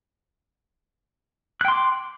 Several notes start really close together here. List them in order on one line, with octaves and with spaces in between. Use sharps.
F#6 G5 C6 D6